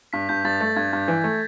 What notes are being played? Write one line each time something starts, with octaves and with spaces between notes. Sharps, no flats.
G2 B6
G2 G6
G2 A6
A3 A6
G2 G#6
G2
E3
A3